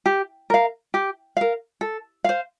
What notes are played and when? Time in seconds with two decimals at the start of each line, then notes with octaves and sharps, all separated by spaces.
0.06 G4
0.50 A#4 F5
0.94 G4
1.37 A#4 F5
1.81 A4
2.24 C5 F5